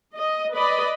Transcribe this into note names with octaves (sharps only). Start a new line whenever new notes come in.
D#5
B4 D5 D#5 B5